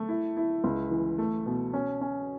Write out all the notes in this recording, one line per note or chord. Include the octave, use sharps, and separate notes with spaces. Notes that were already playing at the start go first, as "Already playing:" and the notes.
Already playing: A3
E4
E4
C#2
E3
A3
B2
C#4
C#4